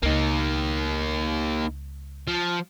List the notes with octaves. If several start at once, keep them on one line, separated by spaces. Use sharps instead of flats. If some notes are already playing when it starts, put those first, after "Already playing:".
C#2 A#3 B3 D#4
F3